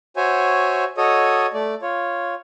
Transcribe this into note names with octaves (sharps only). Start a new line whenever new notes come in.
F#4 C5 C#5 E5 G#5
F#4 A4 C#5 D#5 D#6
A3 D5
F4 C#5